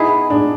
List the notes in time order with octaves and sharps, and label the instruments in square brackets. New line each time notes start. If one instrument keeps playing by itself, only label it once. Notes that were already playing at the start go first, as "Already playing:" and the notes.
Already playing: [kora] B3 E4 G#4 B4 [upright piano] D#4
[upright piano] D4